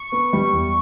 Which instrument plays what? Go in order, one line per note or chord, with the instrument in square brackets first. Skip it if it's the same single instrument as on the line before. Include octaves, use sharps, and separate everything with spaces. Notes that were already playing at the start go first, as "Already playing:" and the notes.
Already playing: [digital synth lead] C#6
[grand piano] B3
G3
E2